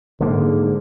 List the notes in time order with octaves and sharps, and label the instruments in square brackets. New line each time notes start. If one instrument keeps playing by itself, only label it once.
[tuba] G#2 [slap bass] D3 A#3